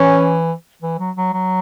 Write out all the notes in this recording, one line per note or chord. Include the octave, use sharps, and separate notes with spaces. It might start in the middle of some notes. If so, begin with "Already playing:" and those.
Already playing: E3 C#4
E3
F#3
F#3
F#3